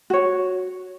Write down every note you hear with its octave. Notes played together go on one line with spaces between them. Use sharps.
F#4 C#5